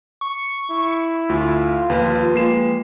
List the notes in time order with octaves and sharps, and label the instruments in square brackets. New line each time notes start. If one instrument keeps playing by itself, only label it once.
[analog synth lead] C#6
[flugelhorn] E4
[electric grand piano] D2 [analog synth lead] F4
[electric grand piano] D#2 [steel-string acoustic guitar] F3 G4 B4
[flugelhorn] G#3 [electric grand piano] A#3 C7 E7